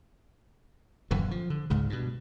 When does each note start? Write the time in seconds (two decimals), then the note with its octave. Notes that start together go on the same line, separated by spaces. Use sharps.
1.11 D#1 F#2 D3 E3
1.31 F3
1.50 D3
1.70 C#2 G#2 C#3
1.90 G2 B2